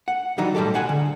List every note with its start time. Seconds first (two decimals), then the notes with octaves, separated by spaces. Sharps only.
0.08 F#5
0.38 D#3 E3 F#3 G3 D#4
0.55 A2 G3 G#3 G4 A4
0.74 B1 G#3 F#5 G#5
0.89 D3